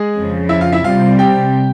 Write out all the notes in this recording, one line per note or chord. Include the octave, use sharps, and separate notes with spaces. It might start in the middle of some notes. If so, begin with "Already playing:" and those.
Already playing: G#3 G#4
F2 C#3 F3
E4 E5
F4 F5
E4 E5
C3 G3 C4 F4 F5
G4 G5